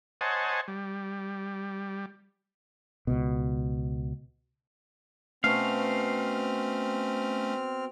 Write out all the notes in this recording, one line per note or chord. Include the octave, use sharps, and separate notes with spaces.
C5 C#5 D#5 F#5 G#5 A5
G3
C#2 B2
B2 A3 C4 C#4 F5 A5 C#6 F6